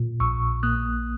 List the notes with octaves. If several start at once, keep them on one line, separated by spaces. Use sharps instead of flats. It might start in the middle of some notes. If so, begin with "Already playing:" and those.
Already playing: A#2
A#1 C#6 E6
A#3 D#6 F#6